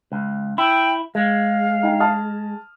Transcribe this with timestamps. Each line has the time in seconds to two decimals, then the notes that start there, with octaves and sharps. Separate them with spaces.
0.12 C#2
0.58 E4 G5
1.15 G#3 F5
1.83 D#4 G5
2.00 A5 D#6 F6